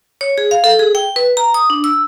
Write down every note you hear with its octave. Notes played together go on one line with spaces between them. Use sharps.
C#5
G#4
F5
A4
G#4
G5
B4
A#5
D#6
D4
E6